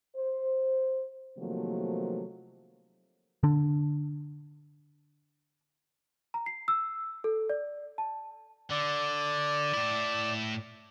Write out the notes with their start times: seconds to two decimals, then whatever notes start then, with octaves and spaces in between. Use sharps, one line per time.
0.16 C5
1.39 C3 D#3 F3 F#3 A3 A#3
3.43 D3 D4
6.34 A#5
6.46 C7
6.68 E6
7.24 A4
7.50 D5
7.98 A5
8.71 D3 D5
9.73 A2 E4